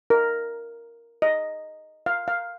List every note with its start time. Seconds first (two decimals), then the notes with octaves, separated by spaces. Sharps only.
0.10 A#4
1.22 D#5
2.06 F5
2.28 F5